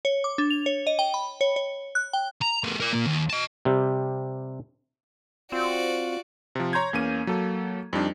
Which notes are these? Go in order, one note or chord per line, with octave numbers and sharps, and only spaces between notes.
C#5
D6
D4
F7
C#5
D#5
G5
B5
C#5
C#5
F#6
G5
A#5
G#3 A#3
A#4 D5
A#2 A#3
D#2
D#5 A5
C3 G3
C4 F4 F#4 D5
C3 F3
C#5 A#5 C6 G6 G#6
E2 A#3 C#4 D#7
F#3 A#3 A4
F2 G3 D4 D#4